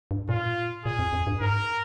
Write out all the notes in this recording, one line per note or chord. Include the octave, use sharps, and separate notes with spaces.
G2
A#2 F4
A#2 G#4
F2
F2
G2
G#2 A#4